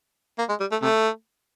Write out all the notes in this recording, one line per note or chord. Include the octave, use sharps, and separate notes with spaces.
A#3
G#3
G3
A3
C3 A3